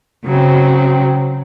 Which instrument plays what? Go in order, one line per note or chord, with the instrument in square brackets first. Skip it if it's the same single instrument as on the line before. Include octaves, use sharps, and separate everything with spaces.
[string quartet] C#3 F#3 C4